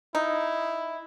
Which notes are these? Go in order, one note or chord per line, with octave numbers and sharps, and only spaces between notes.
D#4 E4